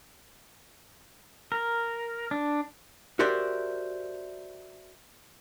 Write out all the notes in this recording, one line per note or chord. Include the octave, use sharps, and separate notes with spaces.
A#4
D4
F#4 G4 A#4 C5 D5 E5